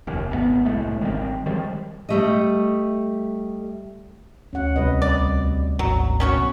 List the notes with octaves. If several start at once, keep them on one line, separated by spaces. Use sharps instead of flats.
F1 D#2
G#1 C#3 B3
C2 A2 G#3 A3
G#1 D#3 G3 C4
D#3 F3 G3 G#3
G3 A3 D#5
D2 C#4 F#5
C2 C3 G3 B4 D#5
D5
G#1 D2 F#3
C#4 F#4 C#5
B1 B2